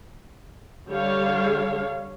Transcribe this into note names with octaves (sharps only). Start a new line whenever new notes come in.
D3 G3 C#5 F5